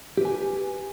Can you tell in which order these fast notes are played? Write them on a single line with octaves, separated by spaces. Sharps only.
G4 B4 G#5